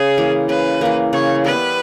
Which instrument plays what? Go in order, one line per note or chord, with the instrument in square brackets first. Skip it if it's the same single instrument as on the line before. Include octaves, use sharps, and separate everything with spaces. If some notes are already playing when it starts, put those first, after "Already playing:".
Already playing: [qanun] C#3 [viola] G#4
[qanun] E3 A#3
[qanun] C#3 [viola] B4
[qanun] E3 A#3
[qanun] C#3 [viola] C#5
[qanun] G3 B3 E4 [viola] B4